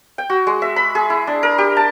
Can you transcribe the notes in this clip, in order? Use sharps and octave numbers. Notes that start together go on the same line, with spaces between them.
G5
F#4
G#3
E5
B5
G#4
E4
D4
A#4
G4
A5